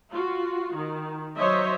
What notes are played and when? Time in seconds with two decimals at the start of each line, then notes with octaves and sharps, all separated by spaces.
0.11 F4 F#4
0.75 D#3
1.38 F#3 C5 C#5 D#5 E5